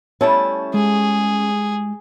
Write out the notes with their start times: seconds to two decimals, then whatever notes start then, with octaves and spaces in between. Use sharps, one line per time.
0.21 G3 A3 C#4 E4 A5
0.74 G#3 G#4